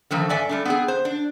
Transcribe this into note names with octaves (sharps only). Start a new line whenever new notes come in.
D3 D#3 F3 A3
G2 A4 D5 E5 G#5
G3 A3 D4
B3 C4 G#4
C5
D4